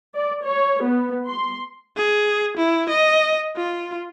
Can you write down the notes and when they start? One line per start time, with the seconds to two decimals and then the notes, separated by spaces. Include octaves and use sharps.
0.14 D5
0.43 C#5
0.83 B3
1.27 C6
1.96 G#4
2.57 E4
2.89 D#5
3.56 F4